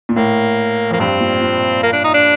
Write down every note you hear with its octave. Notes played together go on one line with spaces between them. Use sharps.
A#2
A2 A#3
F2 A#3
G2 C4
A#2
A#2
A#3
D4
D#4
D4